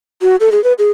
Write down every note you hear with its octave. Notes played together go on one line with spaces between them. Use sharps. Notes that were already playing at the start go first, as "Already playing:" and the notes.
F#4
A4
G#4
B4
G#4